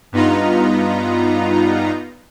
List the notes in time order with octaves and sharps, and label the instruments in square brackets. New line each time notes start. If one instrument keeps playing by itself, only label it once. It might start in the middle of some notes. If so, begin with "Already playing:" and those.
[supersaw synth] G2 B3 D#4 F4 A#5